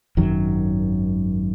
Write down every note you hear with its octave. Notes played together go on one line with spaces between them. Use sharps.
G#1 F#2 D#3 F#3